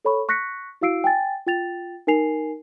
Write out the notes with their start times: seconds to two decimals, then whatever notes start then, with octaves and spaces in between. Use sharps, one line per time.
0.05 A4 C#5 B5 C#6
0.29 C#6 F#6 A#6 B6 C#7
0.81 E4 F#4 F5 E6 C7 D7
1.04 G5 G#5 A6
1.47 F4 G5 A6 F7
2.07 D#4 A#4 G#5 C7 F7